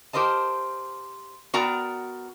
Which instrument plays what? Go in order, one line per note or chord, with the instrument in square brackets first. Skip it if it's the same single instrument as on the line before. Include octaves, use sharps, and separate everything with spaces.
[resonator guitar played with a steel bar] G4 A#4 C5 D#5 A5
B3 F#4 A#4 D5 G5 A#5